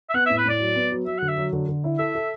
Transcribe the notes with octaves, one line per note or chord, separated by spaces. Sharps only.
E5
B3 F#5
E5
A2
B4
A2 D5
F#3
B3
F#3
F#3 E5
D3 F#5
E5
F#3
D3
D3
E4
A4 E5
A4